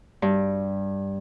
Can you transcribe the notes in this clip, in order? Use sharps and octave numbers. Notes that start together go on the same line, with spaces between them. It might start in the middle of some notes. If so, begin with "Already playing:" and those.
G2